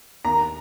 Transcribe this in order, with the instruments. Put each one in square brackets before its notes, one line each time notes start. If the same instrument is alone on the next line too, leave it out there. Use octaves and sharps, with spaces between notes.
[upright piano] D#2 A#5